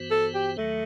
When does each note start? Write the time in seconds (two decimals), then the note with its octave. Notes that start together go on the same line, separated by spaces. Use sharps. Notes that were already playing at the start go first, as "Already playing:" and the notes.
Already playing: G2 E3 B3 F#4 C5
0.11 A4
0.35 G4
0.57 D#2 D#3 F#3 A3